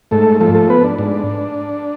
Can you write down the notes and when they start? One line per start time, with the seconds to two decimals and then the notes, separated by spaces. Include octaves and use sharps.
0.11 G#2 A3 A4
0.40 F3 A3 A4
0.55 A3 A4
0.69 B3 B4
0.84 D4
0.98 G#2 D4